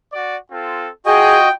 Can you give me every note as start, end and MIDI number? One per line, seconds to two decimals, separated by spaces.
0.13 0.35 66
0.13 0.35 74
0.50 0.90 60
0.50 0.90 65
0.50 0.90 69
1.06 1.51 65
1.06 1.48 66
1.06 1.37 68
1.06 1.48 75
1.06 1.51 79